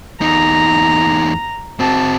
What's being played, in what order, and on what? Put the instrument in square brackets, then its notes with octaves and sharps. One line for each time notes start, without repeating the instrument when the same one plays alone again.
[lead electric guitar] E2 D#4 [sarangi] A#5
[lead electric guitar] C4 F#4 [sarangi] A5